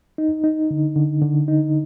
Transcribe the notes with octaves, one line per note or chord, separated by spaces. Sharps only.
D#4
D#4
D3
D3
D3
D#4